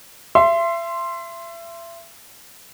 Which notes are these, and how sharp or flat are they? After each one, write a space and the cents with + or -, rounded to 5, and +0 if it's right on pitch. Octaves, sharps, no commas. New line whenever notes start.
E5 +35 C6 +0